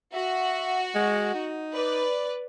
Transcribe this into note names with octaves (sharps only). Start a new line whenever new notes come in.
F#4 E5
G#3
D#4
B4 D5